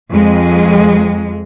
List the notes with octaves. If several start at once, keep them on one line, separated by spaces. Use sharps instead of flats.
F2 G#3